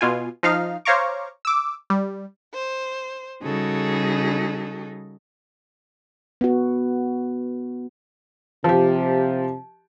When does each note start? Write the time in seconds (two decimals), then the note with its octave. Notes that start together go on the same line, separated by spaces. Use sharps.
0.01 B2 F4 G#5
0.43 F3 D#4 F5 F6
0.85 C5 C#5 F5 A#5 C#6 D6
1.45 D6 E6
1.90 G3
2.53 C5
3.42 C#3 G3 D#4 F#4 G#4 A4
6.41 B3 F#4
8.64 C3 F3 G4